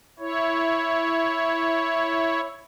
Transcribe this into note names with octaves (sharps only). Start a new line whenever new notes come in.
E4 C#5